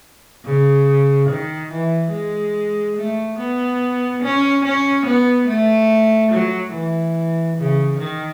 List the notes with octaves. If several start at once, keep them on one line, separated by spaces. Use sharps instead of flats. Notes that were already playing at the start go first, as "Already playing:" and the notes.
C#3
D#3
E3
G#3
A3
B3
C#4
C#4
B3
A3
F#3
E3
C#3
D#3